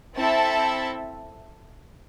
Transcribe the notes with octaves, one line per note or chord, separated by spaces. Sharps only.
C4 E4 A4 E5 A5